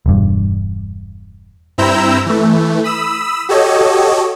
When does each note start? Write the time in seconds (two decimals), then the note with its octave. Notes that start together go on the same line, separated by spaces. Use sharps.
0.06 E1 G2
1.78 G2 C4 E4 A#5 E6 G6
2.26 E3 A3
2.84 B5 D#6 E6
3.49 F#4 G4 A4 C#5 D#5